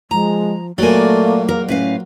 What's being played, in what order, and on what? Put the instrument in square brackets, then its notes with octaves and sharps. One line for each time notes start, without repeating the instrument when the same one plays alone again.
[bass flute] F3 [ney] G#3 [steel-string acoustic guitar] A#5
[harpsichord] A#2 F#3 [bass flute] A3 [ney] A#3 [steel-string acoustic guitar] D5 G#5
[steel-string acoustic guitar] A#4
[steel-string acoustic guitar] A2 B4 F5 [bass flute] C#4